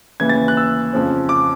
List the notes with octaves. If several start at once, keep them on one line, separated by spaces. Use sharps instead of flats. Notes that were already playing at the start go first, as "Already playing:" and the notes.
D#2 C#3 E3 G#6
A6
F#6
E6
F2 C#3 F3
D6